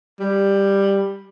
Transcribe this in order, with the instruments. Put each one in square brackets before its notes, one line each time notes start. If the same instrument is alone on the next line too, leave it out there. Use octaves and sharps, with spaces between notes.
[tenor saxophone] G3